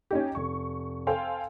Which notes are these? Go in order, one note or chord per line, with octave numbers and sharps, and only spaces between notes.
C#4 D#4 G4
F1 C#6
A4 C5 F5 G5 G#5